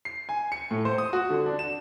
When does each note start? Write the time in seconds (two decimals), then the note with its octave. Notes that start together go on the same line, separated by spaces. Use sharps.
0.05 C7
0.29 G#5
0.52 C#7
0.71 A2
0.85 C5
0.98 D#6
1.13 F#4
1.30 D3
1.46 D4
1.59 E7